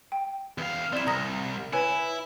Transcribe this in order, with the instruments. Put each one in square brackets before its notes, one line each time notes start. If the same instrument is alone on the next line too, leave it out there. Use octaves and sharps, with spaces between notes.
[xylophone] G5
[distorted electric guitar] E2 F5
[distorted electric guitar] C4 E4 [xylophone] D5 E7
[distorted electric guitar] C2 [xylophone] A#5 D#6 A#6
[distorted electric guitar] E4 [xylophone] B4 C#5 G#5